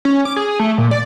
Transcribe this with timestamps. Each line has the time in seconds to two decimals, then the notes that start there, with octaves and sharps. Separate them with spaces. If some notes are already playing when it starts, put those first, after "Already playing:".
0.05 C#4
0.25 D6
0.36 G#4
0.59 A3
0.78 A#2
0.91 D5